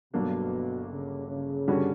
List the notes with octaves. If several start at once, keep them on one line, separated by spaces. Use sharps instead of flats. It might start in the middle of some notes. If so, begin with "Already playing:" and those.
G1 G2 B2 F#3 A#3 D4
C#3
C#3
G2 D3 G3 C#4 F#4